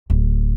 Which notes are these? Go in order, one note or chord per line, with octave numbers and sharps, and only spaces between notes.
D1